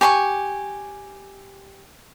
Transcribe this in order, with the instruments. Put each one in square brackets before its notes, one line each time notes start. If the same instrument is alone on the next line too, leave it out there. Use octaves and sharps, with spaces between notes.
[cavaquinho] G4 G#5 C6 C#6